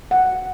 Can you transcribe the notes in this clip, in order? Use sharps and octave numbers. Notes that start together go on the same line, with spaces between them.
F#5